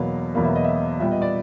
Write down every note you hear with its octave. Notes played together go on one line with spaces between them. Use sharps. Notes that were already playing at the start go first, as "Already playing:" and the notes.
Already playing: E2 B2 F#3 A#3 F5
E2 B2 F#3 A#3 F5
E5
D#5
E5
A#2 G3 B3 E5
D#5
D5